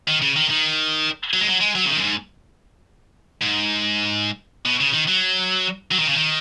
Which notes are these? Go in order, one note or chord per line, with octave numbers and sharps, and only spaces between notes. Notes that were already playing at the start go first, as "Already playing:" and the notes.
D#3
C#3
D#3
D#3
F#3
G#3
F#3
G#3
F#3
C#3
D#3
F#2
G#2
G#2
B2
C#3
D#3
F#3
F#3
D#3
C#3
D#3